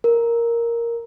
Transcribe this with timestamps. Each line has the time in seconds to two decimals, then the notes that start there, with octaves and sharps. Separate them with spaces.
0.04 A#4